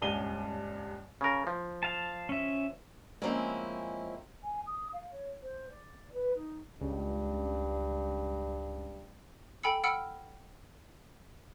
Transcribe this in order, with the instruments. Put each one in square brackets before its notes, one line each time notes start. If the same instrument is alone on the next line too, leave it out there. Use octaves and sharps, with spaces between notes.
[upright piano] D#1 C#2 G2 D#7 G7
[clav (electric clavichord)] C#3 A#4
F3
[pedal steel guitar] F5 A5
C#4 E5
[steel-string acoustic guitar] F3 G#3 A#3 C4 C#4 E4
[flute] G#5
D#6
F5
C#5
C5
D5
B4
D#4
[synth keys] C#2 [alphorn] G2
[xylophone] A4 G5 G#5 B5 E6 C#7
F#5 G5 B5 E6 F6 C#7